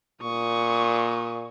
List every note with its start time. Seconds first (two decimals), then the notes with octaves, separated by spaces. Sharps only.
0.22 A#2 C#6 D#6